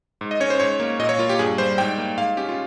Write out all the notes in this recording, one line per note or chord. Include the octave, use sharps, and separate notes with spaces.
G#2
D#5
C#4 C#5
C5
G#2 C#5
A#3
A#2 D#5
C#5
A#3 F4
G4
G2 G#4
G3 C5
G#2 G5
A#3
G#2 F5
C#4 G4
F4